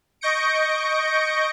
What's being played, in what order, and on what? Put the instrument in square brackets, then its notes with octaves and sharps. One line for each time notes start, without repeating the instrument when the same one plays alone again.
[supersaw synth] D#5 C#6 G6 A#6 C#7 D7